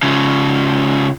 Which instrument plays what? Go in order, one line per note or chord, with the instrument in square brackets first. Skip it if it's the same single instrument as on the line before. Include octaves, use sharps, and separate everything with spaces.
[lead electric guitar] C#3 F3